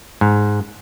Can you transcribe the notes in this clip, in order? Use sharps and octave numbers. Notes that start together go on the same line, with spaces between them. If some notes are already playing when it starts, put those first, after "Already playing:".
G#2